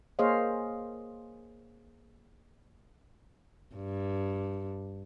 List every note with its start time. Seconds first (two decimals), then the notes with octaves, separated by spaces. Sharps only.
0.19 A#3 G#4 C5 C#5 D#5 F5
3.76 G2